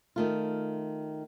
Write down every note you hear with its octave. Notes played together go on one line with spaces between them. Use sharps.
D#3 A3 F4